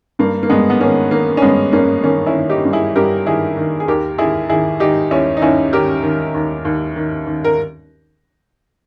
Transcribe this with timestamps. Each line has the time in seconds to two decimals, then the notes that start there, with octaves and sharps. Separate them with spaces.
0.19 G2 A#3
0.43 A#3
0.50 G2 G#3 B3
0.70 B3
0.80 D#3 A#3 C#4
1.11 D#3 A#3
1.37 C#4
1.42 G2 G#3 B3
1.73 G2 A#3 C#4
2.04 D#3 A#3 C#4
2.26 C#4 E4
2.34 D#3
2.49 D#4 G4
2.65 G2
2.73 E4 G#4
2.96 G2 G4 A#4
3.26 D#3 E4 G#4
3.57 D#3
3.80 G#4
3.88 D#2 G4 A#4
4.18 D#2 E4 G#4
4.49 D#3 E4 G#4
4.80 D#3 D#4 G4
5.11 D#2 C#4 E4
5.37 D#4
5.42 D#2 C#4 E4
5.72 D#3 G4 A#4
6.03 D#3
6.34 D#2
6.65 D#2
6.96 D#3
7.27 D#3
7.44 A#4